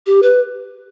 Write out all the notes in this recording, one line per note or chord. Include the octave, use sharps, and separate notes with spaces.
G4
B4